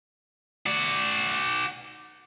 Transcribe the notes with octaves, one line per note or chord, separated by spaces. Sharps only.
F#4 D5